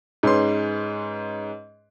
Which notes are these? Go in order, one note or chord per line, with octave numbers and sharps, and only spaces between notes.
G#2 C#4 B4 C6